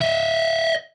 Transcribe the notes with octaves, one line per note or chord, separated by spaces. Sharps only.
D#5 E5